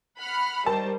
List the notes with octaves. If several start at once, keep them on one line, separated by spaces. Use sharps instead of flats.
F#5 B5 F6
D#3 G3 A#4 C5 A5